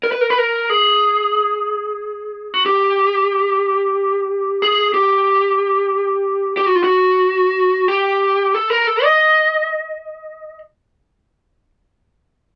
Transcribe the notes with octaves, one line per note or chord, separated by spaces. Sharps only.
A#4
B4
A#4
B4
A#4
G#4
F#4
G4
G#4
G4
G4
F#4
F4
F#4
G4
A4
A#4
A4
D#5